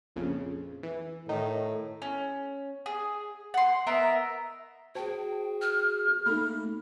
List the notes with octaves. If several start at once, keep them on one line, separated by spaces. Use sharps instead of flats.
A#1 F2 C#3
E3
A2 D#3 D#4
C#4
G#4
F#5 C6
B3 A#4 D#5 E5
F#4 G#4 C5 G5 A5
F6
A3 A#3 D#4 A4 B5